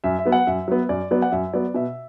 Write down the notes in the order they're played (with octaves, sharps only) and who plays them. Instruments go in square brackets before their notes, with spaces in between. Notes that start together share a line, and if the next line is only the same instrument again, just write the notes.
[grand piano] F#2 E5
E5
F#3 B3
F#5
F#2 E5
F#3 B3
F#2 D5
F#3 B3 D5
F#5
F#2 E5
F#3 B3 D5
B2 E5